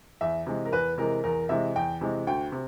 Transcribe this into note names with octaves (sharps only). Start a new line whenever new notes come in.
E2 E5
C3 E3 G#3
A#4
E2 B4
C3 E3 G#3 A#4
E2 A#4
C3 E3 G#3 E5
E2 G5
C3 E3 G#3
D2 G5
C3